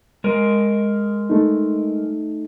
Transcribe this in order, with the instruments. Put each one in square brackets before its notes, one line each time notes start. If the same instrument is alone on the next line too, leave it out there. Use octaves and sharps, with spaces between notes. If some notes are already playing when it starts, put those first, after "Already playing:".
[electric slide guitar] G#3 A#4
[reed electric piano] A3 D#4